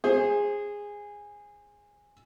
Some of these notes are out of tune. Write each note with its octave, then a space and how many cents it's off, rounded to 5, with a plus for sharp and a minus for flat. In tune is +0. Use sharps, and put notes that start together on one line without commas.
G#4 -15 C5 +20